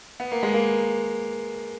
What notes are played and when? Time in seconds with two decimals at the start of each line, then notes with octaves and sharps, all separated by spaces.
0.20 B3
0.32 A#3
0.43 G#3
0.54 A#3